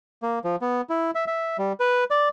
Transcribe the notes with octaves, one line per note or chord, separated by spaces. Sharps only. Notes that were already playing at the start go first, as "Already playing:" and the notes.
A#3
F3
B3
E4
E5
E5
G3
B4
D5